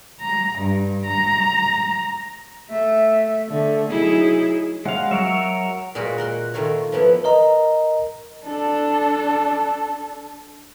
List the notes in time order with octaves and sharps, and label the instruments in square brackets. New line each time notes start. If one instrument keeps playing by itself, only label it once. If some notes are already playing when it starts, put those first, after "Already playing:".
[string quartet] A#5
G2
A#5
[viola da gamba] A3 [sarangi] E5
[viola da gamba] D3 [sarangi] A3
[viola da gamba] F#3 D#4 E4 [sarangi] G#4
[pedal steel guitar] G#3 F5 [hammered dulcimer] F#5
[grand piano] F#3 [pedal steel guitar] A#4 C#5 E5
[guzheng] A#2 G#3 A#3 F4 F#4 B5
A#4 F#5 C6
D#3 A3 A#3 F4 C#5
F3 A#3 B3 E4
[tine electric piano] A#4 D#5 A#5
[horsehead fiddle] D4 A4